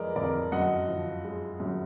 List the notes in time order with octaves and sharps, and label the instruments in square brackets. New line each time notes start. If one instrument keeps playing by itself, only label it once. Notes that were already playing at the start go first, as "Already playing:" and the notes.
Already playing: [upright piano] F2 F3 G#3 A#4 B4 D5 D#5
F2 A#4 D5
F#2 D#5 F#5
F3
G#3
F#2